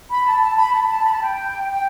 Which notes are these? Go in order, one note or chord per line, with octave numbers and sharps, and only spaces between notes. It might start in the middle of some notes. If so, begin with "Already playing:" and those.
B5
A5
A5
B5
A5
B5
A5
B5
A5
G5
G5